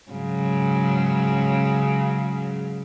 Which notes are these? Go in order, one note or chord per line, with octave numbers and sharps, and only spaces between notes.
G#2 C#3 F#3